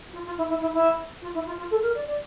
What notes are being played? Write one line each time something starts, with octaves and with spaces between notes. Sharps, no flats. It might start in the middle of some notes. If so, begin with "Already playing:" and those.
F4
F4
E4
E4
E4
E4
F4
E4
F4
F4
A4
A#4
D5
D5